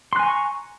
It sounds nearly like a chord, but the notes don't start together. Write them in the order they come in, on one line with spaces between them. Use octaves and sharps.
C6 F#6 G#5 A#5 C#6